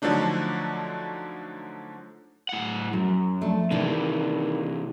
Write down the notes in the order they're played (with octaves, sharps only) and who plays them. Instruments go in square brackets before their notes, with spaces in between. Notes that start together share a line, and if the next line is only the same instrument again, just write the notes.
[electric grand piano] D3 F3 F#3 A3 D4 D#4
[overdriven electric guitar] A2 F#5
[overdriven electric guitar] F#2 [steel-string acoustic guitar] F#3
[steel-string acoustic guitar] F3 A3 D4
[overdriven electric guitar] C3 E3 [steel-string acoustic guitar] D#3 D4